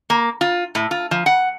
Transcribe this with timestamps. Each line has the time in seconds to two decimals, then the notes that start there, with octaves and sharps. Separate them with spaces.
0.10 A#3
0.41 F4
0.75 A2
0.91 F4
1.11 F3
1.26 F#5